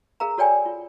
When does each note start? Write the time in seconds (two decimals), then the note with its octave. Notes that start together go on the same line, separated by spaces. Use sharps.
0.20 G#4 A#4 F5 A#5
0.38 F#4 A4 C#5 D5 G5 G#5
0.65 F4